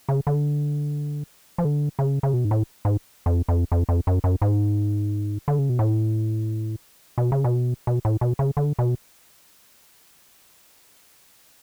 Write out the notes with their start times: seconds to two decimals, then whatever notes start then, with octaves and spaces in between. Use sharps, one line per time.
0.09 C#3
0.27 D3
1.58 F3
1.65 D3
1.99 C#3
2.23 C#3
2.34 B2
2.45 G#2
2.51 A2
2.85 G#2
3.26 F2
3.48 F2
3.72 F2
3.89 F2
4.07 F#2
4.24 F#2
4.42 G#2
5.48 D3
5.59 C#3
5.69 B2
5.79 A2
7.18 B2
7.32 C#3
7.44 B2
7.87 B2
8.05 A2
8.21 B2
8.39 C#3
8.57 D3
8.79 B2